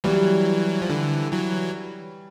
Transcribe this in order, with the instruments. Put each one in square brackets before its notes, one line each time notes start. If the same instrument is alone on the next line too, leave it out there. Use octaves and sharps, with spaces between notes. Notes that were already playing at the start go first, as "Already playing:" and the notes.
[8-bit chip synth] E3 F#3 [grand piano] G3
[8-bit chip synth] F3
D3 E3
E3 F#3